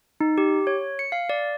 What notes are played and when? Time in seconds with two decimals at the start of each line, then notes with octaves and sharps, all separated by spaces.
0.20 D#4
0.38 G4
0.67 C#5
0.99 C#7
1.12 F5
1.29 D5